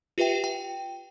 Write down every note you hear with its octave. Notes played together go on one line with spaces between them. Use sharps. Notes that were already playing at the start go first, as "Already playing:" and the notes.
F4 G4 B4 E5 G5
G5